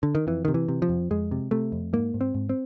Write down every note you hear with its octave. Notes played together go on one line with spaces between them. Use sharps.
D3
D#3
F2 E3
C3 D#3
E3
C3
F3
F2
F2 G#3
C3
C3 A3
F2
G#2 A#3
G#2
C4
G#2
C4